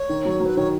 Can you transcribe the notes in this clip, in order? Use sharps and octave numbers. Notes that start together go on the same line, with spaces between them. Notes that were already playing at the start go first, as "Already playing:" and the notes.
Already playing: C#5
D#3
F#3
F#3
B4
D#3 C#5